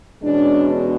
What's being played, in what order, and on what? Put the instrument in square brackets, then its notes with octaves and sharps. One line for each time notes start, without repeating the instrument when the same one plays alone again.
[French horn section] E2 B2 G#3 C#4 D4